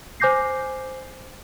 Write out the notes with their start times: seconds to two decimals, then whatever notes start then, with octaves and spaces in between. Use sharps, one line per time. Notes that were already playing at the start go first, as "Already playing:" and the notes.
0.20 C5 G#5 D6 G6 A#6 C7